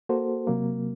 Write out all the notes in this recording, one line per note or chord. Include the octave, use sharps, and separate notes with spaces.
A#3 F#4 A4 C5
C3 F#3 A#3